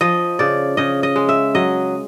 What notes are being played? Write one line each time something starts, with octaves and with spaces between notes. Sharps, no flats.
F3 D#5
C#3 D5
C#3 D#5
D#5
G#3
E5
F#3 D#5